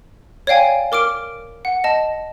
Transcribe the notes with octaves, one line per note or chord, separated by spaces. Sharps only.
C#5 D5 F5 G5 G#5
A#4 D6 F6 D7
F#5
D#5 A5